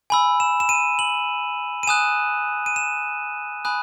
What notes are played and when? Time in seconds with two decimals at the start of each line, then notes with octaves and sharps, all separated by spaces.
0.10 G#5 B5 E6
0.40 E7
0.60 E7
0.69 D#7
0.99 F#7
1.83 D#7
1.87 G#5 D#6 F#6 E7
2.66 D#7
2.76 E7
3.65 G#5 B5 D#6 F#6